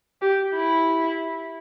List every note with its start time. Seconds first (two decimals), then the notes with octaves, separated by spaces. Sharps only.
0.22 G4
0.55 E4